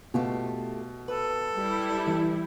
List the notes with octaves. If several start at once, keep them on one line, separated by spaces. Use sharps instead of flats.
B2 A3 F4 G4
A4 B4
G3 E4
E3